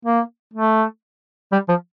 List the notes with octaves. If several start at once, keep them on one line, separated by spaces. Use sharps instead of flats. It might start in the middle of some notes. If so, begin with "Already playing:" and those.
A#3
A3
G3
F3